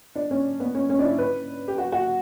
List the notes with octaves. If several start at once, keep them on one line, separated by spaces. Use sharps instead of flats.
D4
C#4
B3
C#4
C#4
D4
E4
B4
G4
F#4
F#4